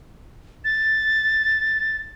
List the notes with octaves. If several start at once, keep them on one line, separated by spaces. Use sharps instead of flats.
A6